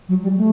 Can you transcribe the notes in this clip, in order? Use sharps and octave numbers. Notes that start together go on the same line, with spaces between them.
F#3
G3
A3